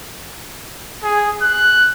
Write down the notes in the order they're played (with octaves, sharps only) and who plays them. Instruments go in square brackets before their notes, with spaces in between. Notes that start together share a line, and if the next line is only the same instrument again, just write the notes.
[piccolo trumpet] G#4
F#6